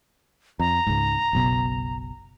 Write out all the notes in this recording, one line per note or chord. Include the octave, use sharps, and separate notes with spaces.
F2 A#5
C#2 G#2
F#1 B1 B2